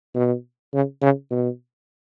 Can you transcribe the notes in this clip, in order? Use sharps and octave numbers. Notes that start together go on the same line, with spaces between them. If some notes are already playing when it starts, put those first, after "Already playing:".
B2
C#3
C#3
B2